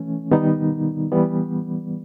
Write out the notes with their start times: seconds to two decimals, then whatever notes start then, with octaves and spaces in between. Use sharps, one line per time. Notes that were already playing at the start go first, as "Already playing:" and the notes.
Already playing: E3 A3 C#4
0.31 D#3 G3 B3 D#4
1.12 E3 G3 B3